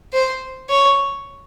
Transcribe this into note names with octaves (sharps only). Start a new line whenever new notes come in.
C5
C#5